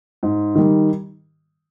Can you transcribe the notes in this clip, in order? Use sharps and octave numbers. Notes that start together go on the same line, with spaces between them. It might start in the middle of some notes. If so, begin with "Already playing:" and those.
G#2
D#3 G3